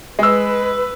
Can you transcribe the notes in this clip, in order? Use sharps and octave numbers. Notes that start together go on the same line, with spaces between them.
G#3 B4 E6